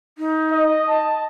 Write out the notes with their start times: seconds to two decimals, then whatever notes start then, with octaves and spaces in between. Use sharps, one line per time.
0.18 D#4
0.52 D#5
0.88 A5